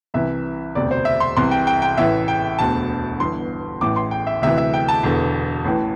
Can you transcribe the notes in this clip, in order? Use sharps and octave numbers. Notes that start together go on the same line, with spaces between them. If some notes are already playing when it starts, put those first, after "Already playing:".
C2 C3 E3 E5
E1 D2 C3 D5
C5
E5
C6
C2 C3 E3 C6
G5
G5
G5
A1 A2 E3 E5
G5
E1 D2 D3 A5
G1 G2 E3 C6
A1 A2 E3 D6
C6
G5
E5
D2 C3 E3 E5
E5
G5
A5
E1 E2 D3
A1 A2 E3